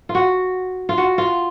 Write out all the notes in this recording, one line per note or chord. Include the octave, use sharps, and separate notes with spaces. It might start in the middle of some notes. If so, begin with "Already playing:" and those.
F4
F#4
F4
F#4
F4